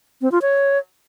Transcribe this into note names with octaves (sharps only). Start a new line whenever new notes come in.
C4
F4
C#5